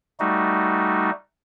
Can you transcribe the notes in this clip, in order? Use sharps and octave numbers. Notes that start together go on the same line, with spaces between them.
G3 A3 D#4 F#4